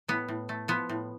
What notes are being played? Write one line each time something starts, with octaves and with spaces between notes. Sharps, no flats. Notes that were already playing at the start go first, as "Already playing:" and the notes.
A2 B3
A2
A3
F3 B3
A2